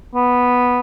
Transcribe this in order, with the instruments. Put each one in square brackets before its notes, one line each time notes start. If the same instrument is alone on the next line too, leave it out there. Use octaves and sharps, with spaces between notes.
[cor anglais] B3